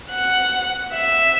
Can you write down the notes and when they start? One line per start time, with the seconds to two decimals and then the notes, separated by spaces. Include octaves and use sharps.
0.11 F#5
0.95 E5